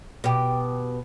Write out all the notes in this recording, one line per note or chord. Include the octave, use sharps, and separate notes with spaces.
B2 G4